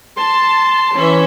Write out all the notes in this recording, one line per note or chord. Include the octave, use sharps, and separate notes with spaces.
A5 C6
E3 C#4 E5